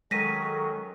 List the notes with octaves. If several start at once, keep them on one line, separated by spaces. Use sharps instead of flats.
D#3 F#3 G#3 C#4 A4 A#6 B6 D#7